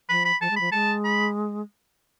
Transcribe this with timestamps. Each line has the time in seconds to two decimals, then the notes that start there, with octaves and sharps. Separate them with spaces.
0.09 F3 B5
0.25 B5
0.40 F3 A5
0.50 G#3
0.56 F3 B5
0.72 G#3 A5
1.05 B5